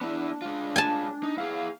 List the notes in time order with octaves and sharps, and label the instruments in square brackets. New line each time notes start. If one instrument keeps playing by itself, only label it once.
[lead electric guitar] B3 E4 [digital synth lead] D4
[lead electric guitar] G#3 F4
[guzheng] G#5 A5
[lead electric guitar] D#4
[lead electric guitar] E4 G#4 [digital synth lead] F5